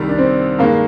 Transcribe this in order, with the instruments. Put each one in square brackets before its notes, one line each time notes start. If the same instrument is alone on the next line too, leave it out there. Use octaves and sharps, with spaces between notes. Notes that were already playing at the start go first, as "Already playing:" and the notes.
Already playing: [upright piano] C2 C3 D#3 G3
[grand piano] D4
C4
[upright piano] G2 D#3 G#3 [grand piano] A#3